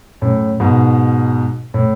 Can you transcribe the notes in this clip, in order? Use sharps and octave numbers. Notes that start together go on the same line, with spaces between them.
F#2 A2
G#2 B2
A2